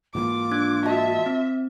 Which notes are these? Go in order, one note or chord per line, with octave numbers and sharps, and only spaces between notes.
G#2 E3 A#3 F4 D6
D4 F#6 G#6
F#4 D#5 E5 A5
C4